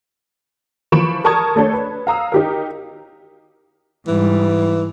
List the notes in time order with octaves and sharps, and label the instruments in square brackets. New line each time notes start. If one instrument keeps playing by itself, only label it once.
[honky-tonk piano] E3 F3 B5 C#6 D7 E7
A4 A#4 A5 C#6 D#6 G#6
A3 D4 A4 C#5
B4
F5 A#5 D#6 E6
D#4 G4 A#4
[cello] G#2 G3 [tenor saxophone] E3